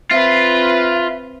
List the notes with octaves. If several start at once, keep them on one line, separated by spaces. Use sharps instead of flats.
C4 F4 B4 E5